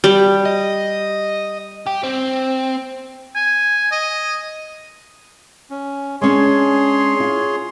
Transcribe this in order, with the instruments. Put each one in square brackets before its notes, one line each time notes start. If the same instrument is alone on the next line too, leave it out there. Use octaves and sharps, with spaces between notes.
[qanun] G3
[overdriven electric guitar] D#5
G4
C4
[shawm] G#5
D#5
[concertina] C#4
[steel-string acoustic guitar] G#3 C#4 D4 [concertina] G#4 C#5 C6
[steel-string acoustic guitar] F4